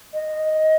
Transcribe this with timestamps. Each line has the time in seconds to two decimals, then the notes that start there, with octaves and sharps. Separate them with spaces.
0.14 D#5